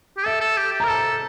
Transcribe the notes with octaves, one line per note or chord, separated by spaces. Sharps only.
G4
A4 E5
A4
G4
G4
A#5
A#4
A4 A5